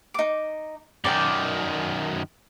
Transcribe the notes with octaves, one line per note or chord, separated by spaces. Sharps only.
D#4 D6
F#2 D#3 D5 G5